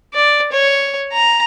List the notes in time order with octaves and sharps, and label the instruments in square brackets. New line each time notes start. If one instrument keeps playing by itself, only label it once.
[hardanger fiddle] D5
C#5
A#5